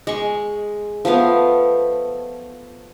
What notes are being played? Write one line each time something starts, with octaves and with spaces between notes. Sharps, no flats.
G#3 C#6
F3 A3 B3 F5